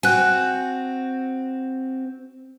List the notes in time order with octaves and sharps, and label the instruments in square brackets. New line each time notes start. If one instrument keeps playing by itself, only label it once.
[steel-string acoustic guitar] C4 F#4 [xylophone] G#5 F#6